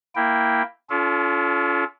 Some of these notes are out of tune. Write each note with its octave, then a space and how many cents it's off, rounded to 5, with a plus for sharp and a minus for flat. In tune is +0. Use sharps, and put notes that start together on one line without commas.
A#3 +0 E4 +0 G5 +0
C#4 +40 F4 +0 A4 -25